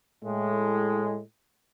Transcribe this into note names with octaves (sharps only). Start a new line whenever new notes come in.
A2 G#3